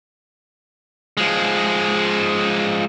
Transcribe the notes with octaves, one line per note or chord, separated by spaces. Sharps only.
F3 G#3